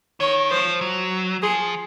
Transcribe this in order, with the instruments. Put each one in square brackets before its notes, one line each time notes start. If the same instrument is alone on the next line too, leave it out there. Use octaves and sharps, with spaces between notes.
[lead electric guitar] D#3 [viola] C#5
[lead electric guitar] F3 [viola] C5
[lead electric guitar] F#3
[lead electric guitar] F3 [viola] G#4